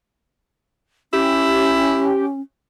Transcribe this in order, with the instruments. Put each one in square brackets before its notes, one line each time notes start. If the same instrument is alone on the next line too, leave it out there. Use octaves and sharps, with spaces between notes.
[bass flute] C#4 [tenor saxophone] E4 [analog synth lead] G4